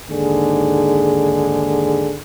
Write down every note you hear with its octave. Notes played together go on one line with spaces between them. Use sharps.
D#2 G#2 D3 G#4